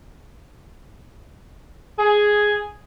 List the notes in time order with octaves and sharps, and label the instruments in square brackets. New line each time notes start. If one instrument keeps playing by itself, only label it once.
[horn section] G#4